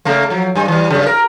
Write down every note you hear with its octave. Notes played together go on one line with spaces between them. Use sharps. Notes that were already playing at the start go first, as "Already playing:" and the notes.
C#3 A3 A#3
F3 F#3
G2 G3
E3 G3
G2 C#3
A#4